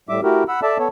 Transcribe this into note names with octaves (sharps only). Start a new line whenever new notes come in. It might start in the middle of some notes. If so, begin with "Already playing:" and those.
A2 G3 E5 D6
A3 E4 F#4 G4 A#4
F#5 B5 E6
A4 D5 E5 A5
B3 A4 C#5